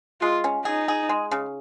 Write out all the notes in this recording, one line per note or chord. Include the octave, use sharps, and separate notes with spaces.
G#3 F4
C#4
D#4 G#4
G#4
G#3
C#3